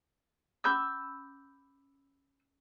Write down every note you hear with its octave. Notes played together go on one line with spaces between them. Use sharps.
C#4 B5 D6 E6 G6